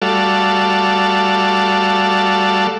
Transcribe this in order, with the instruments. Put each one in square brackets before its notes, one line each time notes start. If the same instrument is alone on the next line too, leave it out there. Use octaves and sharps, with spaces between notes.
[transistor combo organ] G3 A3 F#4 A4 D5 F5